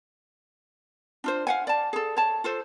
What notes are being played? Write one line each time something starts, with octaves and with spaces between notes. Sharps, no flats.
D4 F4 C5
F5 F#5 G#5
D5 A5
G#4 A4
C#5 A5
F4 A4 C5